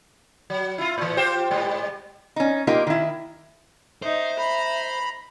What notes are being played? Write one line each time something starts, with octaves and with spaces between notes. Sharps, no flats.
F#3
E4 F4
A2 E3
F4 G4 C5
G#2 G3
C#4 D#4
A#3 D#4 F4 G4
D#3 E4
D#4 C5 E5
A#5 B5